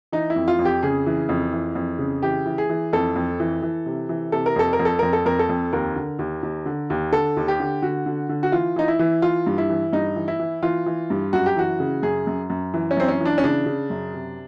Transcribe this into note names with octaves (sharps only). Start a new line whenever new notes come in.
E3 D#4
E4
F2
F4
F2
G4
C#3 G#4
E3
F2
E3
F2
C#3
E3 G4
E3
G#4
E3
F2 A4
F2
E3
E3
C3
E3
C3 A4
A#4
F2 A4
A#4
F2
A4
F2 A#4
A4
F2 A#4
A4
F2
D#2 A#4
D3
D#2
D#2
D3
D#2
D3 A4
D#2
G4
D3
D3 F#4
D3
D3
F#4
E3 F4
E3 D#4
E4
E3
E3 F4
G2
E4
E3
G2 D#4
E3
E4
E3
E3 F4
E3
G2
F#2 F#4
G4
E3 F#4
C#3
F#2 G#4
F#2
F#2
E3
C#4
F#2 C4
C#4
E3
D4
C#4
C#3 D4
C#3
F#2
C3